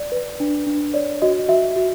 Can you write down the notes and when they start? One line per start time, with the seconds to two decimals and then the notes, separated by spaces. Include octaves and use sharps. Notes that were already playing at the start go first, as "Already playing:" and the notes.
Already playing: D5
0.12 B4
0.40 D4
0.67 D4
0.94 C#5 D5
1.22 F#4 D#5
1.48 F#4 E5
1.76 F#4